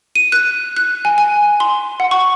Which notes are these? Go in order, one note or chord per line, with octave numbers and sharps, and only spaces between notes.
D#7
F#6
F#6
G#5
G#5
C6
F#5
C#6